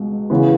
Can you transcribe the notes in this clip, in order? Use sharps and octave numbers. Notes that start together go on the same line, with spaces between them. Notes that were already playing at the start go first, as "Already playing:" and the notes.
Already playing: C#2 B2
E2 C#3 E3 B3